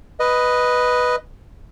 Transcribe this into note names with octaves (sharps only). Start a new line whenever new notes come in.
B4 D#5